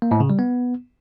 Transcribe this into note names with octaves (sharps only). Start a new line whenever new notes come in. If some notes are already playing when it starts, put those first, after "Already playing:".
A#3
A2
C#3
G3
B3